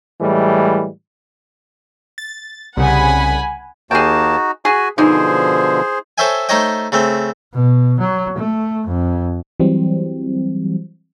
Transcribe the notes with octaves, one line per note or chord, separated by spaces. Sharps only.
A2 E3 G3 G#3
A6
C2 C#3 F#5 G#5 B5
D#2 A#3 D#4 F#4 G#4 G5 A5
F#4 G#4 G#5 B5
B2 D3 E3 F3 D#4 G#4 C5
A4 C5 C#5 E5 G5 G#5
A3 D#4 C5 C#5 D#5 G5
C#3 A3 C4
B2
F#3
A3
F2
E3 F#3 G3 C4